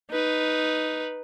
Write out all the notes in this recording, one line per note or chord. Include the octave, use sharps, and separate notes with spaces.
D#4 B4